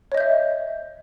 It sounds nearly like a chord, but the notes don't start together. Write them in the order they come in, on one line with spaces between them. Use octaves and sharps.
C#5 D#5 G6 E5